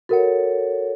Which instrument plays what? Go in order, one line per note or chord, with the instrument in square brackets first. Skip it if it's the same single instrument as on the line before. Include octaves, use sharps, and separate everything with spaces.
[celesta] F#4 A#4 F#5 [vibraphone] A4 C#5